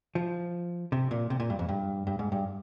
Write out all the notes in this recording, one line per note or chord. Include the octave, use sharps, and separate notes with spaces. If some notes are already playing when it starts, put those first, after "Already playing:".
F3
C3
A#2
C3
A#2
G2
F2
G2
G2
G#2
G2